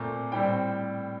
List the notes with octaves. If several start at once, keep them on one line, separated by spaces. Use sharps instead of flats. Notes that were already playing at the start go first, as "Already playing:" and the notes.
Already playing: A#2 A3 C4
A2 G3 C4 G5